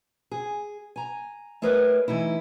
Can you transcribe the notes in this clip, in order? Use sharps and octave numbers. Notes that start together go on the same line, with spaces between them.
G#4
G#5 A#5
A3 G#4 A#4 B4 C#5 D#5
E3 A3 D#4 E4